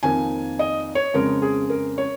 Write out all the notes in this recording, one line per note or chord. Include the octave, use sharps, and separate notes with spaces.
F2 D#3 A#3 G#5
D#5
C#5
F2 C#3 G#3 A#4
G#4
A#4
C#5